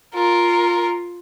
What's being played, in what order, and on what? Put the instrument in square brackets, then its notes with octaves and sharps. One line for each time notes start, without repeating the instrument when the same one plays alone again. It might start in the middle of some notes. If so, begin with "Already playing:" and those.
[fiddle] F4 [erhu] A#4